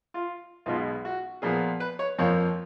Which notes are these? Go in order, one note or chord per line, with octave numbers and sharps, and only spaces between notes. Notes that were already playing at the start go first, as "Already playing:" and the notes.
F4
B1 B2 G#3 F4
F#4
A#2 F3 B3 G#4
B4
C#5
F2 F3 A#3 C#5